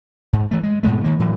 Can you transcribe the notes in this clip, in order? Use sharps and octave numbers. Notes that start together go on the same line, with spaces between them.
G#2
E3 A3
G#3
G#2 B2 G#3 A3
D#3 A#3
A2 E3 F#3